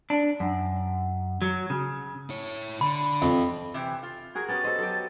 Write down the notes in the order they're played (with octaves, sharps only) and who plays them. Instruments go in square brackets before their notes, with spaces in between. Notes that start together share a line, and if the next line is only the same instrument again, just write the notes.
[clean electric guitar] D4
F#2
F#3
C#3
[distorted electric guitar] E4 C#5
[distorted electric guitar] D3 [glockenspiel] B5
[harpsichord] F2
[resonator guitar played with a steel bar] C3 E3
F4
[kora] F#4 G#4 A#4 [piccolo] G#6
[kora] B3 C#4 G4 [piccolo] A6
[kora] A4 D#5 [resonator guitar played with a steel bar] C5
[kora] F#3 [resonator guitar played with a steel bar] G4 A4